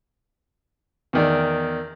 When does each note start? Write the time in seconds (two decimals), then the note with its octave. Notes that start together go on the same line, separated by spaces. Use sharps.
1.13 E2 D#3 D5